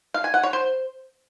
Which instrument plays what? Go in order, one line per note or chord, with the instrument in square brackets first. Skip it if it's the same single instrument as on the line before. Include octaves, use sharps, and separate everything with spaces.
[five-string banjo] F5
G#5
F#5
C#5
C5